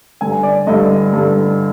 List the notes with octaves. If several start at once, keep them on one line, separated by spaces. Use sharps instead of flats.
G2 D3 G#5
D5
G2 D3 D#5
G2 D3